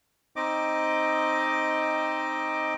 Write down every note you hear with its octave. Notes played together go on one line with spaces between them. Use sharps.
C4 D#4 D#5 D6